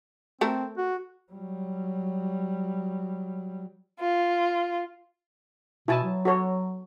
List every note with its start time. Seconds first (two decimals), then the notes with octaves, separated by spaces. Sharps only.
0.41 A3 C4 A4 A#4
0.77 F#4
1.32 F#3 G3
4.01 F4
5.88 B2 E4 G#5 A5
6.04 F#3
6.25 F#4 A4 C#5